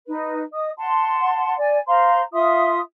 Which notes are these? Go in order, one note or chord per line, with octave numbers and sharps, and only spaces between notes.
D#4 B4
D#5 D#6
F#5 A5 C6
D5 G#5
C5 F5 A#5 C6
F4 E5 C6 D#6